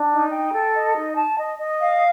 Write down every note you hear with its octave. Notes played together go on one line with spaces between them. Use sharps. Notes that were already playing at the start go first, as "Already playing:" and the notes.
Already playing: D4
D#4
G5
A4
D#5
D#4
A5
D#5
D#5
F5